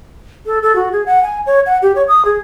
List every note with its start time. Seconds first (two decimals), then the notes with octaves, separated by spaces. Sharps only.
0.46 A4
0.63 A4
0.76 F#4
0.92 G#4
1.06 F#5
1.23 G#5
1.46 C#5
1.66 F#5
1.82 G4
1.95 C#5
2.08 D#6
2.25 G#4